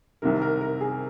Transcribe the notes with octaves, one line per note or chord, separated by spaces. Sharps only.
C2 C3 D#3 A#4
A#4
A#4
G#4